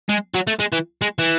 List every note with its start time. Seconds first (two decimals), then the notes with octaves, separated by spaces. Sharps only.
0.09 G#3
0.34 F#3
0.47 A3
0.60 G#3
0.72 E3
1.02 G#3
1.19 E3